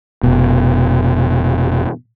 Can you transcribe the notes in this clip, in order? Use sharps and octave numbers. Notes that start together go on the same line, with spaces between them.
F1 B2